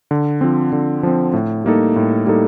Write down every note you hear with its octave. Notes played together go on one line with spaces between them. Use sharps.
D3
F3 C4
D3
F3 C4
A2
G3 A#3 D#4 A4
A2
G3 A#3 D#4 A4